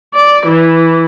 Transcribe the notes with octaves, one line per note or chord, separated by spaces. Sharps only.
D5
E3